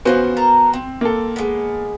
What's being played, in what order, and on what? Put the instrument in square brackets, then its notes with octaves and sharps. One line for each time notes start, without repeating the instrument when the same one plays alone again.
[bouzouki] E3 F3 C#4 [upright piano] B3 F#4 C5
[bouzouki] A#4 A5 A#5
C4
[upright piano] A#3 A4
[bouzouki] G#3 B3